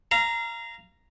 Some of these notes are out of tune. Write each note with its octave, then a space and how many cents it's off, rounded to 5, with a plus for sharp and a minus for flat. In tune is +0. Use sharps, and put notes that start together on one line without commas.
F5 -25 A#5 +0